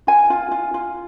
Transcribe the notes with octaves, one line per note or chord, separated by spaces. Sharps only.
F4 G#5
F4
F4
F4